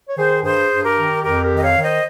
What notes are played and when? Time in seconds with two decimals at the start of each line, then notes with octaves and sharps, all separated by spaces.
0.08 C#5
0.17 D#3 G#4 C5
0.44 G2 G#4 C5
0.71 G2
0.83 G4 A#4
0.97 D#3
1.24 F2 G4 A#4
1.43 G4 A#4
1.50 D#3
1.57 D#5
1.63 C#5 F5
1.77 D#3
1.83 C5 D#5